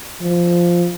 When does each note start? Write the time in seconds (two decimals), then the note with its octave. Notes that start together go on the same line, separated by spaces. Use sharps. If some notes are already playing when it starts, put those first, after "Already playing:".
0.21 F3